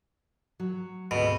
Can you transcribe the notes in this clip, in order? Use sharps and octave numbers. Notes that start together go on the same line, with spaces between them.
F#3
D2 G#2 B2 C4